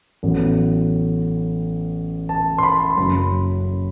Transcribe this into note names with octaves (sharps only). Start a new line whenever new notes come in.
A1 A2 F#3 B3
A5
C6
B5
C6
F#1 F#2 F#3 B5